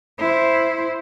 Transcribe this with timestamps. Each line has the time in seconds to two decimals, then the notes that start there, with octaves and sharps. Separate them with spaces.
0.18 E4 C5